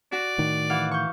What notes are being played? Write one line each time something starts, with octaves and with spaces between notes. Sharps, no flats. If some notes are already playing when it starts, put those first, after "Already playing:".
F#4 D5
A2 D#3
E3 F5 F#5
C#6 G6